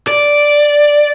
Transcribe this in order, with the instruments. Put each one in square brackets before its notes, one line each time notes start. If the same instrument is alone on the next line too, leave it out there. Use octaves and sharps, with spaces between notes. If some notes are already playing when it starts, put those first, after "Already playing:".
[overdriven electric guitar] D5